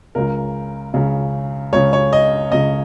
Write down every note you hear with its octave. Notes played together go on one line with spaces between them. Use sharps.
C#2 C#3 A#4
C#2 C#3
C#2 C#3 C#5
C#5
D#5
C#2 C#3 D#5